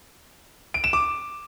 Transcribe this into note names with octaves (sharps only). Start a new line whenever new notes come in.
D7
E7
D6